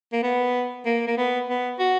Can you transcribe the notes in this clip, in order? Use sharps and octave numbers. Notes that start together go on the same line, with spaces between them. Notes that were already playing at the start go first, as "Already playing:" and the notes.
A#3
B3
A#3
A#3
B3
B3
F#4